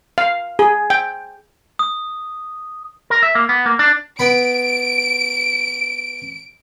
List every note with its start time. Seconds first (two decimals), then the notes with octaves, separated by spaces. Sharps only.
0.18 F5
0.59 G#4
0.90 G5
1.79 D#6
3.10 A#4
3.23 E5
3.35 A#3
3.49 B3
3.66 A#3
3.79 D4
4.19 B3 B5 D7